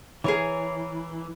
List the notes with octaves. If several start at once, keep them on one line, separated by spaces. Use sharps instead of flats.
E3 G#4 A#4 C#5